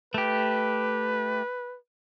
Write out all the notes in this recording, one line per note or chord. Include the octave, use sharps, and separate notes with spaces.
A3 G4 B4